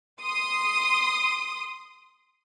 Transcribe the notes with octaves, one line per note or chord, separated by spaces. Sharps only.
C6 D#6